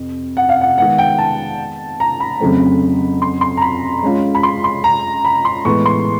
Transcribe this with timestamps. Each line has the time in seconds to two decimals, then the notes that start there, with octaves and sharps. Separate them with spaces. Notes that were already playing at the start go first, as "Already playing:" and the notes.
Already playing: F2 C3
0.37 F#5
0.49 F5
0.61 F#5
0.78 D#3 G#3 B3 F#5
0.98 G5
1.18 A5
2.00 A#5
2.20 B5
2.40 F2 C#3 F#3 A3 C4
3.22 C6
3.41 C6
3.57 A#5
3.62 B5
4.03 G#3 C#4 F4
4.35 B5
4.43 C6
4.64 C6
4.84 A#5
5.25 B5
5.45 C6
5.65 A2 E3 G#3 B3 C#6
5.86 C6